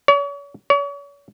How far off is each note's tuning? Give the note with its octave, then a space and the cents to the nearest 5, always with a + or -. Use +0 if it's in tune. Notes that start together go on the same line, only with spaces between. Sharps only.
C#5 +40
C#5 +40